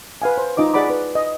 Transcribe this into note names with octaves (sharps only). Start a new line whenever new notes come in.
B4 F5 G#5
C5
D#4 F4 D#5 D6
G#4 D5 F#5 B5 D6
B4
D#5